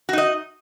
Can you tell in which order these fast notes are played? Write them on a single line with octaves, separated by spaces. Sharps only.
F#4 D#4 D#5